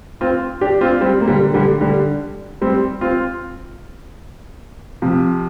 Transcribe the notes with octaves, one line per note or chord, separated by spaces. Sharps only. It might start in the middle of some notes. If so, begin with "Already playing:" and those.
C4 F4
D4 G4
C4 F4
G3 C4
A#3
D3 G3
D3 G3
D3 G3
G3 C4
C4 F4
C3 F3